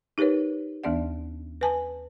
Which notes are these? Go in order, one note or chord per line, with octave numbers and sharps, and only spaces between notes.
D#4 G4 A#4 B4 C#5
D#2 E3 B3 D4 D5 F#5
B4 G#5 A5